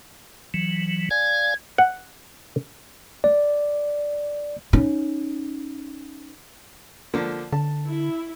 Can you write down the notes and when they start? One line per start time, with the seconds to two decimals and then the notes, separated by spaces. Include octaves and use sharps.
0.54 E3 F#3
1.11 D5 F5 G#5 G#6
1.78 F#5
3.24 D5
4.73 C#4 D#4
7.14 D3 F3 A#3
7.52 D3 A5
7.89 E4